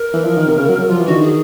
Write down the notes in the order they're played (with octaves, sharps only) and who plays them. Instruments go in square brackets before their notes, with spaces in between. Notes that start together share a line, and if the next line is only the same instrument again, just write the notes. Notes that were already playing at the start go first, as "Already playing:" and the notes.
Already playing: [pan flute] A#4
[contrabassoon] E3
F3
D#3
C3
C#3
F#3
F#3
[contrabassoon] F3 [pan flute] F4
[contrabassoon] E3
[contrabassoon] D3 [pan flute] F#4
[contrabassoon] D#3
[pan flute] G#4